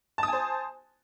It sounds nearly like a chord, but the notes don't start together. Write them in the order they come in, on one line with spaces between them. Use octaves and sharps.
A5 D#6 G#5 C5